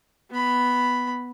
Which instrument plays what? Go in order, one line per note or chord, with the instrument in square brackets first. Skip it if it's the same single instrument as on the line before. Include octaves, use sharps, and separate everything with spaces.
[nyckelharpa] B3 B5